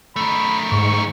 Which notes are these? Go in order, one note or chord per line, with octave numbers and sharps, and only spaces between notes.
D#3 A3 B5
G#2 C#6